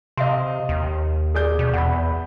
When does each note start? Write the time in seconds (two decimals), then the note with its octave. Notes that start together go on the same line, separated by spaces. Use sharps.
0.17 C3 D#5 F5 C6
0.69 D#2
1.35 G#4 D5 G6
1.59 B2
1.73 E2 F#5 B5